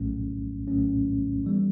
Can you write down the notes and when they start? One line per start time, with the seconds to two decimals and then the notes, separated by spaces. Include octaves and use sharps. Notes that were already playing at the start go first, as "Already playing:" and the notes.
Already playing: A#1 A2 F#3 A3 C#4
0.68 A#1 A2 F#3 A3 C#4
1.44 E3 G3 B3